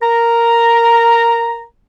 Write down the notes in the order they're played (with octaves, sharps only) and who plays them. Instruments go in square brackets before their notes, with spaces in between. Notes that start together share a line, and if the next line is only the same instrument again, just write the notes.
[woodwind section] A#4 A#5